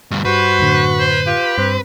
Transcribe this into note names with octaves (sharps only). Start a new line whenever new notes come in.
D2 G2
G2 G3 F#4 B4 C5
F#2 A2 D3
C5
F4 G4
G2 C4 F#6 B6